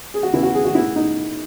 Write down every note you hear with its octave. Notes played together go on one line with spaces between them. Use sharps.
G#4
F#4
E2 C#3 E3 E4
F#4
G#4
F#4
E4
D#4